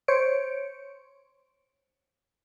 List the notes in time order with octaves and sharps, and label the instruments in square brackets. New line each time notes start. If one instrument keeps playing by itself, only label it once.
[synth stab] C5 C#5 C#7 D7